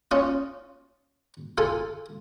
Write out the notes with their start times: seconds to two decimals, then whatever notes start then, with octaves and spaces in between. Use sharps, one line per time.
0.11 C#4 F4 D#6
1.58 F4 A4 G#5